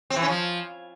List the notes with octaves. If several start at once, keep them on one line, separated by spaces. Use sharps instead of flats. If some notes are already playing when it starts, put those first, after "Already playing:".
C4
E3
C#4
F3